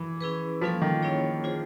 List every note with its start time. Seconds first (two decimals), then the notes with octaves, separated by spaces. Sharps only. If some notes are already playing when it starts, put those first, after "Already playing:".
Already playing: E3
0.21 C#4 E4 G#4 B4
0.62 F3 G3 A#3 C#4 F4 A4
0.82 D#3
1.02 A#3 C#4 E4 G#4 C#5
1.44 D4 F4 G#4 C5